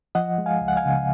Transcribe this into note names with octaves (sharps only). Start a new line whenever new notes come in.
F3 D#5 F#5
G#3
F5 G#5
C#2
F#5
F5 G#5
C#3